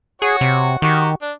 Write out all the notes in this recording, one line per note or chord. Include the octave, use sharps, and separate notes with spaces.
F#4 G#4 C#5 F#5
C3
D#3 F#4 G4 C#6
D4